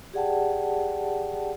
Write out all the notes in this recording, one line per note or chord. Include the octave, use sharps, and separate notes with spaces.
G4 G#4 D5 F#5 G5 A5